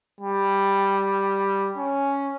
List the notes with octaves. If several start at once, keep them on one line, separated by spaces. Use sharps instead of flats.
G3
C#4